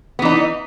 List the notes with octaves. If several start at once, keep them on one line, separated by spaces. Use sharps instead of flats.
E3 B3 D#4